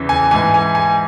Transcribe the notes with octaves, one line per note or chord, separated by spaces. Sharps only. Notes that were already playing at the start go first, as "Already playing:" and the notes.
Already playing: E2 C#3 E3
G#5
G#2 E3 G#5
G#5
G#5